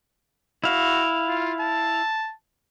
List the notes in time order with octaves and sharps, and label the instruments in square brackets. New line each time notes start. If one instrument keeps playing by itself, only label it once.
[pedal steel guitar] E4 F5 [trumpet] F#4
[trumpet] F4
A5